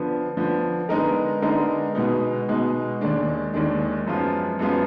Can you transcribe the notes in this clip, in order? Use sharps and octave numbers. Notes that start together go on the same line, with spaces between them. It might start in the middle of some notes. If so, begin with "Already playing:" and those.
Already playing: D3 F3 B3
D3 F3 B3
D3 G#3 B3 D#4 A#4
D3 G#3 B3 D#4 A#4
B2 G#3 B3 D#4
B2 G#3 B3 D#4
D#2 D#3 G#3 D4
D#2 D#3 G#3 D4
F#2 F3 G#3 B3 F4
F#2 F3 G#3 B3 F4